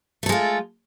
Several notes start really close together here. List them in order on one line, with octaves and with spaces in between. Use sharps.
A3 A4 G#3 F4